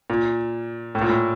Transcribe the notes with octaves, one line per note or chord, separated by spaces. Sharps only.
A#2
A2
A#2
A2